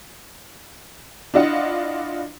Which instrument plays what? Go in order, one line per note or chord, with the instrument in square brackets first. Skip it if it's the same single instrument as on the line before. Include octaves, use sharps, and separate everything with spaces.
[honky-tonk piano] D4 E4 F4 D#5 F#5